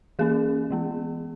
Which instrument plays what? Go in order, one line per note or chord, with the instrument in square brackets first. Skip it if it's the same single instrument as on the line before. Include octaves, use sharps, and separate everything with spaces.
[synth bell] E3 A#3 C#4 G#4
E3 G#3 B3